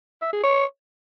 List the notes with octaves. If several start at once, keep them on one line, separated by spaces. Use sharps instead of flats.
E5
G#4
C#5